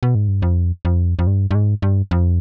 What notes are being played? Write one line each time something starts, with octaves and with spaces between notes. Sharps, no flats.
B2
G#2
G2
F2
F2
F2
G2
G2
G#2
G2
F2